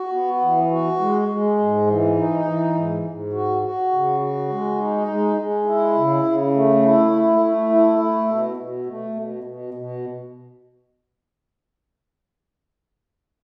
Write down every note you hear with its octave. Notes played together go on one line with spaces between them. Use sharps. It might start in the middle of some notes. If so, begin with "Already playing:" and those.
Already playing: F#4
B3
E3
F#4
G#3
G#3
G#2
E3
D#4
E3
G#2
G#2
F#4
F#4
C#3
F#4
G#3
D#4
G#3
G#3
E4
C#3
C#3
A3
E4
A3
A3
E4
A3
B2
B2
A3
B2
B2
B2